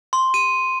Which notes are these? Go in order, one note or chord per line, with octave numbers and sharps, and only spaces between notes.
C6
D#7